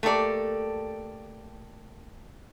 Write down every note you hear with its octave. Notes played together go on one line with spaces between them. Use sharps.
A3 A#3 G4 A4 D5